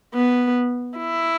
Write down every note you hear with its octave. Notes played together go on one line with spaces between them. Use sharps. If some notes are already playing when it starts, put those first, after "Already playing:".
B3
E4